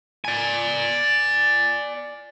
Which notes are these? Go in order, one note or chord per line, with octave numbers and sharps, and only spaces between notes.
D5 G#5